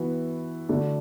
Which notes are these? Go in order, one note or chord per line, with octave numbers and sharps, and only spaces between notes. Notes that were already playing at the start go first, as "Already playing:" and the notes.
Already playing: E3 B3 F#4
D3 A3 D4 F#4